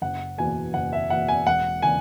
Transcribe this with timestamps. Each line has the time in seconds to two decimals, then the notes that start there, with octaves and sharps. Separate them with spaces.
0.02 F#1 F#5
0.38 E2 B2 A#3 G#5
0.74 F#1 F#5
0.93 E5
1.10 E2 B2 A#3 F#5
1.28 G#5
1.46 E1 F#5
1.82 C#3 E3 A#3 G#5